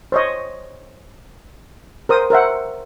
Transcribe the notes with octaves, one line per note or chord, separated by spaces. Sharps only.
C5 C#5 D#5
A#4 C5 D#6
A#4 C5 E5 F#5